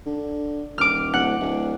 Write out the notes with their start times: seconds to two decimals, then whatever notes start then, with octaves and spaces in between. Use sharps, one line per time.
0.06 D3
0.78 D#1 D6 F6
1.13 D1 F#5
1.40 D1